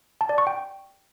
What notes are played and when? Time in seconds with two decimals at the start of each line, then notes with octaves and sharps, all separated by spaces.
0.21 A5
0.29 D5
0.38 C#6
0.47 G5